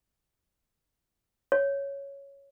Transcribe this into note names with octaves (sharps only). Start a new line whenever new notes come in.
C#5